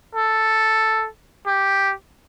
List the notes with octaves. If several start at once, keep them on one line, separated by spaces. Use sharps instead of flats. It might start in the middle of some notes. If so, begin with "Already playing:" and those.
A4
G4